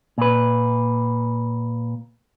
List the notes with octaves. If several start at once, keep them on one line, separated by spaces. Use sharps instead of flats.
A#2 B4